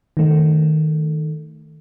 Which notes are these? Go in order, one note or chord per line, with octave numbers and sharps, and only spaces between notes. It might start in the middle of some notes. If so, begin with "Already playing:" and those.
D#3 A3